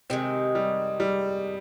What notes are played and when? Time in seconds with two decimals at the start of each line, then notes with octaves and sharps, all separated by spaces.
0.10 C3 D#3 G#3 C4
0.55 G3
1.00 G3